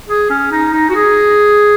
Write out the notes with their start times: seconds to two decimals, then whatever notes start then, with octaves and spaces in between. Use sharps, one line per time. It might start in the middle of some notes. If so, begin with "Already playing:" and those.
0.08 G#4
0.30 C#4
0.52 D#4
0.73 D#4
0.90 F#4
0.95 G#4